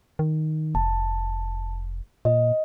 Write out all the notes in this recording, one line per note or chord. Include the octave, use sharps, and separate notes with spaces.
D#3
F1 A5
A#2 D#5